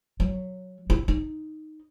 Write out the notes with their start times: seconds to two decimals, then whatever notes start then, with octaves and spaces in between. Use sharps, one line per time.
0.20 F#3
0.90 E4
1.08 D#4